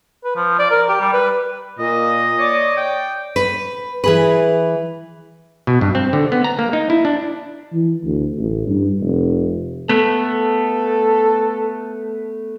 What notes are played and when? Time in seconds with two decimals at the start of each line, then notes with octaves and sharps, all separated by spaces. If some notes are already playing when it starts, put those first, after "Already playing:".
0.24 B4
0.36 F3
0.59 D5
0.71 A#4
0.89 G4
1.01 G3
1.13 B4
1.79 A#2 D#5
2.38 C#5 D5
2.77 G5
3.36 B4
4.04 E3 G#4 B4
5.67 B2
5.81 G2
5.95 C4
6.13 D3
6.32 B3
6.44 A#5
6.59 A#3
6.73 D#4
6.90 E4
7.05 D4
7.72 E3
8.04 D2
8.38 A1
8.68 G2
9.00 F1
9.90 A3 B3 A4